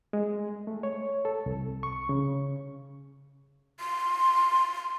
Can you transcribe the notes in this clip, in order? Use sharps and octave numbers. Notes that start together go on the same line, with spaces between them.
G#3
A3
C#5
A4
C2
C#6
C#3
C6